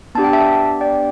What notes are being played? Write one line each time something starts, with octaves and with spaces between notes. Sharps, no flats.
B3 D4 G4 A5
G5
E5 A5
D5 G5